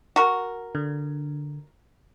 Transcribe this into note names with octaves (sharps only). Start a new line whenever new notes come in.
F#4 A#4
D3